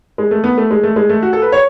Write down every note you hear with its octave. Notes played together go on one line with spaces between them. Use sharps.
G#3
A3
B3
A3
G#3
A3
G#3
A3
F#4
A4
B4
C#5